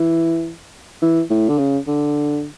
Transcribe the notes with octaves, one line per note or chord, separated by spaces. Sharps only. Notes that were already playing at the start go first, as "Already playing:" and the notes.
Already playing: E3
E3
A2
D3
C#3
D3